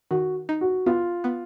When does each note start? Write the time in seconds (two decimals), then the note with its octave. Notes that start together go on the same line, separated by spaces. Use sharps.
0.11 D#3 F#4
0.49 D#4
0.61 F#4
0.86 B3 F4
1.24 B3